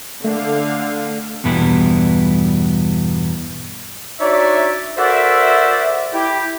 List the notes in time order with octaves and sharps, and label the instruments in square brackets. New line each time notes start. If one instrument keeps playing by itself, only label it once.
[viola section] D3 F5 [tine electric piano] A3
[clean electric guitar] E2 G2 B2 G3 B3 E4
[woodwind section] D4 D#4 F#4 C#5 D5 E5
F#4 A4 A#4 C5 D5 E5
E4 G4